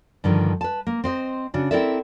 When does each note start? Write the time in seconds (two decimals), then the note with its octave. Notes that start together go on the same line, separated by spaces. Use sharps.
0.24 G2 D3 D#3 F3
0.61 B4 A5
0.87 A#3
1.04 C4 C5 D#5
1.54 C#3 D4 F#4
1.71 C4 E4 A4 A#4 D5 E5